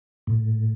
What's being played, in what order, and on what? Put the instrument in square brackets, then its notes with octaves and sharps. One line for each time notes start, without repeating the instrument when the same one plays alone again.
[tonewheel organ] A2